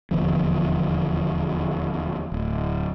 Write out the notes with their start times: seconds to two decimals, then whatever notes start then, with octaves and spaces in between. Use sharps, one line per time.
0.11 D#1 E2 D3 F3
2.32 D1